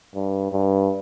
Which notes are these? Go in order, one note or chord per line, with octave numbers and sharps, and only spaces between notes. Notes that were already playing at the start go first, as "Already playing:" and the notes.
G2
G2